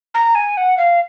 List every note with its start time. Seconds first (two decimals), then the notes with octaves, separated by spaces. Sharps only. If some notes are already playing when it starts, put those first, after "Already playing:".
0.14 A#5
0.35 G#5
0.57 F#5
0.78 F5